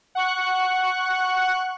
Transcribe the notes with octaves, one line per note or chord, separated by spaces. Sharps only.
F#5 C#6 F#6